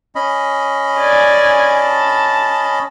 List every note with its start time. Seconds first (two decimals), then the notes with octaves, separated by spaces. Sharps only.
0.15 C#4 D#5 B5
0.98 D5 G#5
1.80 A5